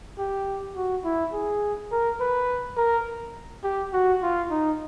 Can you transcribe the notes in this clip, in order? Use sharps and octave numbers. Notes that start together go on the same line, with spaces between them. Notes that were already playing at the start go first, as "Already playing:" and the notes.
G4
F#4
E4
G#4
A#4
B4
A#4
G4
F#4
F4
D#4